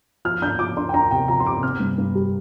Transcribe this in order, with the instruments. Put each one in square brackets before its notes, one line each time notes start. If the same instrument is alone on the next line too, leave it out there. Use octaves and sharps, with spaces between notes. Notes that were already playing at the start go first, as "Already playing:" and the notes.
[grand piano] F3 F6
D4 G6
F3 D6
D4 C6
G5
D4 A#5
C3 G5
F3 A#5
C6
C3 D6
C4 F6
G2
G2
G3